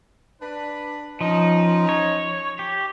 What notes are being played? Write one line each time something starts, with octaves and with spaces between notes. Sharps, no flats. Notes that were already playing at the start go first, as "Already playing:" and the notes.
D4 B4
F3 C#4 D#4
C#5
G4